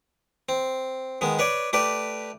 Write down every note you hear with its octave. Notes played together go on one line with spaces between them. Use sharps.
C4
D#3 G#3 B3
B4 C#5 D5
A3 G4 B4 D5